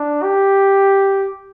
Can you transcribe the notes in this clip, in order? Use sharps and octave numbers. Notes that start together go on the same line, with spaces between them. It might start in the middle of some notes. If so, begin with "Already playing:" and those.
Already playing: D4
G4